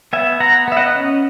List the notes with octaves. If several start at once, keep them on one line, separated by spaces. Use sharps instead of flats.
B3 E5 G#5
B3 F#5 A#5
B3 E5
D#5 F#5
C#4